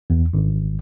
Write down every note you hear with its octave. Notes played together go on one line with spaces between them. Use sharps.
E2
G#1